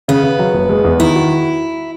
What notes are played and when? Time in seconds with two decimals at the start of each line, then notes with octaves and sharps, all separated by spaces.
0.08 C#3 B3
0.23 C#3
0.39 F#3
0.53 F#1
0.69 G#3
0.85 E2
1.00 D#3 E4
1.15 F#4